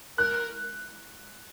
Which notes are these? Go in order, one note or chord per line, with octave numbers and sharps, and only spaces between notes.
A#4 F#6